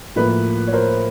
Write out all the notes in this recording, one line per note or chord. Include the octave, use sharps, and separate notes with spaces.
A2 F3 A#3 B4
C#5
A#4 C5